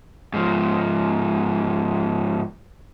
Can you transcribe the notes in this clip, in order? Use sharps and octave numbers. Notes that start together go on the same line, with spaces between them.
G#2 F3